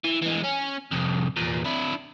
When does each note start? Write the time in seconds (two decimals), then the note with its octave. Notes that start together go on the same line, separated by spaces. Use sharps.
0.04 E3
0.22 E3 G#3
0.45 C#4
0.92 C2 F2
1.37 E2 A#2
1.65 D4 E4